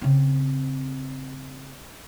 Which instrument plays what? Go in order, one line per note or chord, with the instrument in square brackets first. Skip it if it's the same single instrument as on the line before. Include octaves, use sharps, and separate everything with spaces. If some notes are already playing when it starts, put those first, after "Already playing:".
[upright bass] C#3 C4